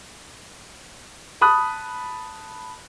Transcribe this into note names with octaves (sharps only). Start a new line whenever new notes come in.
A5 B5 D#6 F#6